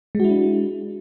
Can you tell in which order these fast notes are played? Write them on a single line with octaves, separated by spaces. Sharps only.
G#3 F#4 E4 D4